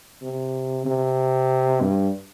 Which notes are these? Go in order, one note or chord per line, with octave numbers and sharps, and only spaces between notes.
C3
C3
G2